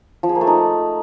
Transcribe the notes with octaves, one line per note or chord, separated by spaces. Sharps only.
F3
G#4
A#3
A3
D#4